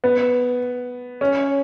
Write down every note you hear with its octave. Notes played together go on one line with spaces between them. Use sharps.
B3
C#4